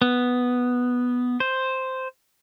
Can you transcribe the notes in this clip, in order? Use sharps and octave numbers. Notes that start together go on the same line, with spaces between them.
B3
C5